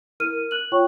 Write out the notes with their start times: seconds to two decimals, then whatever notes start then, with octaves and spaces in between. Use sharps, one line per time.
0.20 E4 A#4 F6 D#7
0.51 F#6 F#7
0.72 F4 C#5 G5 C#6